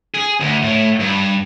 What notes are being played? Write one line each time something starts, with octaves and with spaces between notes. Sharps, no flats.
G#4
D2
A2
G2